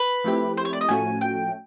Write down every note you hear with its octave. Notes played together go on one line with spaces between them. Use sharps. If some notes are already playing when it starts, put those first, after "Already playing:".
Already playing: B4
F3 A3 C4 E4 G4
C5
C#5
D5
D#5
A2 F3 A3 C#4 F#4 G#5
G5